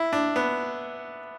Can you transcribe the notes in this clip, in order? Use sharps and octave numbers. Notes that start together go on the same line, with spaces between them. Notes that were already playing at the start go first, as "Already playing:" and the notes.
Already playing: E4
D4
B3